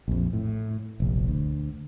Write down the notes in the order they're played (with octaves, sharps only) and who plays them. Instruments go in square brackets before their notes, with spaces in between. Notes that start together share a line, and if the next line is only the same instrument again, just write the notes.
[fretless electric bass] A#1 F2
A2
F1 A#1
D2